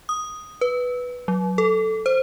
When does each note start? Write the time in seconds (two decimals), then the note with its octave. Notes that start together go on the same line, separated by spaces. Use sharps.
0.09 D#6
0.61 B4
1.28 F#3
1.58 A4
2.06 C5